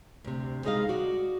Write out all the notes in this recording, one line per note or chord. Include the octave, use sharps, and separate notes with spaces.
D2 C3
G3 G#3 D#4 G#4 D#5 F5
F#4 D5